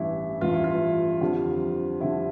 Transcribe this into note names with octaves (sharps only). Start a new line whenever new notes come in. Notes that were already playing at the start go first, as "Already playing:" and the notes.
Already playing: A1 G2 E3 E4
A1 G2 E3 F4
E4
F4
F2 D3 G3
F2 D3 G3 E4